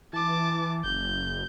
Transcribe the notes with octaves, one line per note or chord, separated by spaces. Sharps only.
E3 A5 D6
F#1 G6